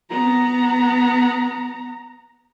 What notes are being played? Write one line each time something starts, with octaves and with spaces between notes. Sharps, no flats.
B3 A#5